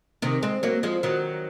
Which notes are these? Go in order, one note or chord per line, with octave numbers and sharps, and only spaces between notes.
C3 D#3
G#3 C4
F#3 A#3
F3 G#3
D#3 F#3